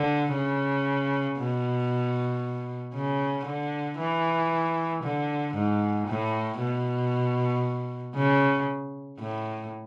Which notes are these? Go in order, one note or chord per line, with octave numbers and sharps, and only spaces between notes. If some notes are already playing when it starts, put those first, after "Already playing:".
Already playing: D3
C#3
B2
C#3
D3
E3
D3
G#2
A2
B2
C#3
A2